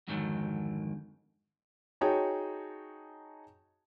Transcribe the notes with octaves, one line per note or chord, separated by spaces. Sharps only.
F2 G#2 D3 D#3 F#3
D#4 F#4 G#4 C#5 G5 A5